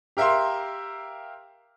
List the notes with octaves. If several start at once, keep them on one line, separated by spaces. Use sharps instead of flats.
G4 A#4 E5 F5 C6